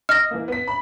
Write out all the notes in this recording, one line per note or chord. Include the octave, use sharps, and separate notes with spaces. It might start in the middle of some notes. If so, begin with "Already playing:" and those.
D#5 F6 A#6
E3 A#3
B3 B6
B5